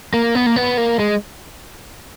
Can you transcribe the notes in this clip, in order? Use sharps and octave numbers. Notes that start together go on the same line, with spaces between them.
A#3
B3
A#3
B3
A#3
G#3